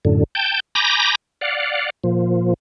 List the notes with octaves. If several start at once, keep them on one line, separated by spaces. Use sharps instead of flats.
F#2 A2 D3
G5 A5 G6
G#5 A#5 B5 D6 G6 A#6
D5 F5 F#5
A#2 F3